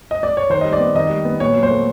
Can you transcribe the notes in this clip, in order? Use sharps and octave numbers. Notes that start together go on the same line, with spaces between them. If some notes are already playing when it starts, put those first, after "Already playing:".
D#5
D5
C#5
D#3 C5
G3 D#5
D5
B3
D#3 D#5
G3
B3
A#2 C#5
F#3
C5
A3